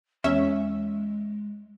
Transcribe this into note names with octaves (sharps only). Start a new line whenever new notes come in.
E2 G#3 C#4 E5